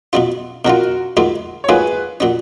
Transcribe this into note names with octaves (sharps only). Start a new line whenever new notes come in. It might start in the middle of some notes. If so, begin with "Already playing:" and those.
B2 F#3 C#4 F4
B2 F#3 C#4 F4 F#4 A#4
G#2 F#3 A#3 F4
C#5
G#2 F#3 A#3 F4 G#4 B4
A#2 F#3 C#4